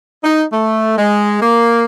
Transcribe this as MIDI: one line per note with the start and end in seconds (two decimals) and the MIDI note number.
0.23 0.42 63
0.52 0.97 57
0.98 1.41 56
1.41 1.84 58